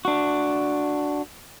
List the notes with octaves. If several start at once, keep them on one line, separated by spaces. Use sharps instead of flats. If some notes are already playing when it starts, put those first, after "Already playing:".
D4 F#4